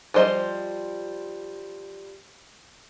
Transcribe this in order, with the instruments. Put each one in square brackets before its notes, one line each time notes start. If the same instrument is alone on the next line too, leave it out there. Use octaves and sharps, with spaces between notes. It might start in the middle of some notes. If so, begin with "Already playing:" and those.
[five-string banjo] F3 G3 C5 D#5